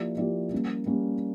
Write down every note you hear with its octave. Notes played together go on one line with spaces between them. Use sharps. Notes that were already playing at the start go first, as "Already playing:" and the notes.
Already playing: F3 A#3 E4 G4 D5
F3 A#3 E4 G4 D5
G3 A#3 C#4
G3 A#3 C#4